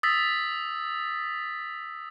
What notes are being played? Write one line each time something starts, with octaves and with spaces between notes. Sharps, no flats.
D#6 E6 A6 B6